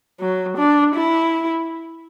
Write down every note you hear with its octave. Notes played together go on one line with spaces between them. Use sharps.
F#3
D4
E4